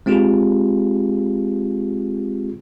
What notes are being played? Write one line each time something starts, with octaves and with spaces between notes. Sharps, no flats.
G#3 C4 F4 G4 G#4